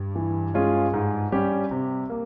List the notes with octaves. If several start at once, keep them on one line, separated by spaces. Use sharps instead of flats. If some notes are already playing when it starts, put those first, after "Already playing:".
Already playing: G2
E3
G#3 C#4 F4 G#4
G#2
G3 C#4 G4
C3
A#3